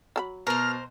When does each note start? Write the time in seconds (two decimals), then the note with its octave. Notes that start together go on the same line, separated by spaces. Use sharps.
0.16 F#3 A4 B5
0.47 B2 A#4 C5 F6